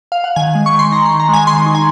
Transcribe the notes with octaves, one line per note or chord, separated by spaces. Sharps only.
F5
F#5
D#3 G#5
G#3
C#6
D#3
C6
D#4 A#5
D#3 C6
A#5
G#3 G#5
D#3 C6
D#4
G#5